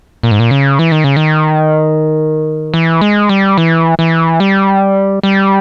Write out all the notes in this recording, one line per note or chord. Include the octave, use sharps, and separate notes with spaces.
A#2
G#2
A#2
C#3
E3
D#3
C#3
D#3
E3
G#3
G3
E3
E3
G3
G3